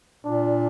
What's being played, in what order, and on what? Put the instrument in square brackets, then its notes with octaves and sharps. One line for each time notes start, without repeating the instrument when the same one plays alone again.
[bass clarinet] A#2 [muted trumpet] D4